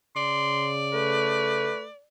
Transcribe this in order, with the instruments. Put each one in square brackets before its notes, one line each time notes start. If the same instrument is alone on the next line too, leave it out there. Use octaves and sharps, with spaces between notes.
[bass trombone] C#3 [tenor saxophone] D5 [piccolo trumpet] C6
[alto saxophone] A3 [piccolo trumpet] B4